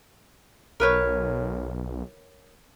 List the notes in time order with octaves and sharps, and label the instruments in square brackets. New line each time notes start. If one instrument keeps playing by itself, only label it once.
[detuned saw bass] B1 [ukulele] A#4 B4 C#5